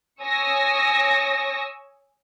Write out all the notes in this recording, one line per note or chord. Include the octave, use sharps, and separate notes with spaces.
C#5 G#5 C#6 D#6 E6 A#6